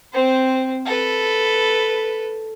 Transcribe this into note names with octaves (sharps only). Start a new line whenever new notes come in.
C4 C5
A4 B4